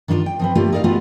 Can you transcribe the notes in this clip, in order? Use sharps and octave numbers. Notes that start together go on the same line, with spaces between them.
D#3 D4 D#4 F4 D5
G5
F3 C4 B4
G3 A3 A#3 D4 F4 G4
D#4 A#4 D5 D#5 F5
G3 A3 B3 F4 F#4